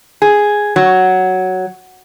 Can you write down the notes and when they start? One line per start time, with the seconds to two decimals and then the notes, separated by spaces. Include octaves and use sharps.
0.22 G#4
0.76 F#3